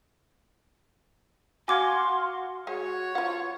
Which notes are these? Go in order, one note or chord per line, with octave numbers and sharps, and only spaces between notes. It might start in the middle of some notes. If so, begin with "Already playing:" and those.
F#4 F5 G#5 C6 D6 G#6
G#3 F#4 G#4 C#5
F3 F4 F#5